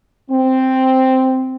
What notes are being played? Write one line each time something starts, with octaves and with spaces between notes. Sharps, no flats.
C4